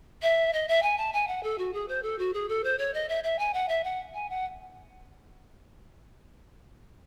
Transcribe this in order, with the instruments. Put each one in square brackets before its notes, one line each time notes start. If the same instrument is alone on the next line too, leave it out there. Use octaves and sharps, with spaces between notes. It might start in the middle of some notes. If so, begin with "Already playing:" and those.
[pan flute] E5
D#5
E5
G#5
A5
G#5
F#5
A4
F#4
G#4
C5
A4
F#4
G#4
A4
C5
C#5
D#5
E5
E5
G#5
F#5
E5
F#5
G#5
F#5